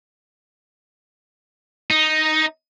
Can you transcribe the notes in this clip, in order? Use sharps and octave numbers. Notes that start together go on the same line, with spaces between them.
D#4